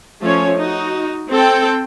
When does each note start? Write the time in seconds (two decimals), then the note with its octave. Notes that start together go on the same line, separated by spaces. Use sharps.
0.22 F3 A3 C#4 C#5
0.57 D#4 F#4
1.30 C4 A4 G5